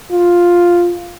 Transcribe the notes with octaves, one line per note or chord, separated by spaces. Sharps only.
F4